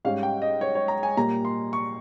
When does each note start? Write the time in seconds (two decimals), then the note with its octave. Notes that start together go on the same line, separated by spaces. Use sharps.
0.05 G#2 G3 C#4 F5
0.23 G5
0.42 D#5
0.61 C#5
0.75 C#5
0.88 A#5
1.03 G#5
1.17 A#2 G3 A#3 A#5
1.45 C6
1.73 C#6